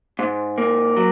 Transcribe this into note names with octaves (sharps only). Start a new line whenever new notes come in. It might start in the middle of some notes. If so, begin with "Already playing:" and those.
G#2
A#3
F#3